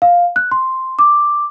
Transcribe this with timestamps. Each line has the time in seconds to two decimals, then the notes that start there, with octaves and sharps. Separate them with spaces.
0.02 F5
0.36 F#6
0.51 C6
0.99 D6